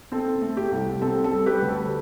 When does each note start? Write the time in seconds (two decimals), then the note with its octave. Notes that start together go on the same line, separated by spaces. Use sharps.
0.12 C4 A4
0.42 A3
0.57 G4
0.72 C2
1.02 C4 A4
1.24 A4
1.32 G3
1.46 G4 B4
1.62 D2
1.69 A4